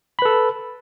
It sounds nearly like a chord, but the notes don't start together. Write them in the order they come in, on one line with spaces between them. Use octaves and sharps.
B5 B4 A4